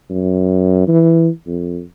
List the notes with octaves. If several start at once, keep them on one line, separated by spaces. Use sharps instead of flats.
F#2
E3
F2